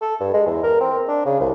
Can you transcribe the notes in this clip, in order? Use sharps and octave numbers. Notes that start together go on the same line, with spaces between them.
A4
G2
G#3
E2
A#4
C4
D4
C#3
C2